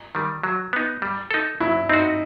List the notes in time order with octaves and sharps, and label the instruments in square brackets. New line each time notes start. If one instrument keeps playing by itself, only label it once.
[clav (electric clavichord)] D#3 G3
F#3
B3 D#4
G3
D#4 A4
[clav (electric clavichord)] F#3 [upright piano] E4
[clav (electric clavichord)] C4 F#4 [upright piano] D#4